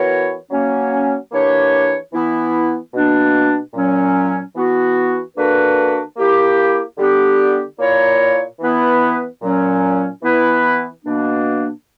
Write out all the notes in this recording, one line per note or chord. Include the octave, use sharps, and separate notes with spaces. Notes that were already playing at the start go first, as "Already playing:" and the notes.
Already playing: E3 B3 F#4 A#4 C#5
F#3 A#3 C#4
E3 A#3 D4 G4 C#5
E3 B3 E4
B2 A#3 D4
A#2 F#3 C#4
E3 B3 F#4
D3 A#3 D4 F#4 B4
A#3 E4 G4
D3 G3 B3 D4 G4
A#2 A#3 E4 A#4 C#5
E3 B3 E4 B4
A#2 F#3 C#4
E3 B3 E4 B4
B2 A#3 D4